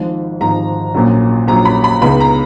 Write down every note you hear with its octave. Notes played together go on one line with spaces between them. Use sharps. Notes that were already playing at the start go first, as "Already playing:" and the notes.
Already playing: G#1 G#2 F3
G#1 G#2 F3 A#5
A#1 A#2 F#3 C#4
A#1 A#2 F#3 C#4 A#5
B5
B5
C#2 C#3 G#3 B3 D#4 B5
A#5